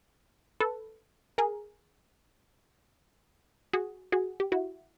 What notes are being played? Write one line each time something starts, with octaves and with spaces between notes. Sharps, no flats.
A4 B4
G#4 A#4
F#4 G#4
F#4 G#4
G4
E4 F#4